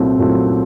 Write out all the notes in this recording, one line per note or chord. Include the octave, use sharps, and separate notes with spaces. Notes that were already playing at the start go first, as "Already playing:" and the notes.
Already playing: C2 A#2 F#3 A3 C4
A#2 F#3 A3 C4